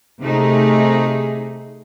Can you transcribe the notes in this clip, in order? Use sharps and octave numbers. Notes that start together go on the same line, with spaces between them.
C3 A3 D#4 G#4